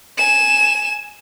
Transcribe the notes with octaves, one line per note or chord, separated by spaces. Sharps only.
G#5 E7